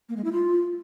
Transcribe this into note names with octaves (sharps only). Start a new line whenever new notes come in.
A#3
G#3
E4
F4